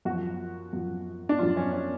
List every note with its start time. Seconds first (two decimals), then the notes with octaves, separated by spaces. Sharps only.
0.05 F#2 F3 F#4
0.73 F#2 F3
1.29 D4
1.39 F#2 F3 F4
1.57 C#4
1.73 C#4